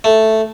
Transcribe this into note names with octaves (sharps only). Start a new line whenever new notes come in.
A3